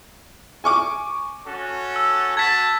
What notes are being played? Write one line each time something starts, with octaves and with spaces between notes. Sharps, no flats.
G#5 C#6 D6
C#4 F#4 A4
E6
F#4 A5 G#6 B6